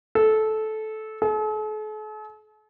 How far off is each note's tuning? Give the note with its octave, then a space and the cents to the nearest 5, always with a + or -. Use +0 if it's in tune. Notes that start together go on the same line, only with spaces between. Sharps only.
A4 -15
A4 -45